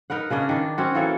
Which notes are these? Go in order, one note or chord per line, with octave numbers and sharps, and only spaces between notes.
D#4 A#4 B4 F#5
C#3 C#4 D4 D#5
D#3 D4
C4 C#4 F#4
E3 A#3 A4 C#5